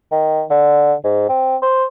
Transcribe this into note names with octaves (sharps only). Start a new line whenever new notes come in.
D#3
D3
G#2
C4
C5